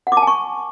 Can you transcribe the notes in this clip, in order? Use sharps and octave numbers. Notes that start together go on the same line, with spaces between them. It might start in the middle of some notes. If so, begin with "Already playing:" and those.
F#5
D6
A5
G#5
C#6